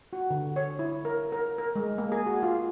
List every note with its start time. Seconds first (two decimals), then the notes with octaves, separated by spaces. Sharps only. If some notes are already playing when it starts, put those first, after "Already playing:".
0.13 F#4
0.30 D3
0.56 C#5
0.79 E4
1.05 A#4
1.32 A#4
1.58 A#4
1.76 G#3
1.98 A#3
2.12 G#4
2.26 F#4
2.43 F4